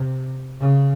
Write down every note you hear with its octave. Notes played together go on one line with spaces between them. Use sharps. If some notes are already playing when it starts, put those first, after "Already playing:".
Already playing: C3
C#3